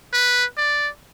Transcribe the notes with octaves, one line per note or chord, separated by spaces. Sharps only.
B4
D5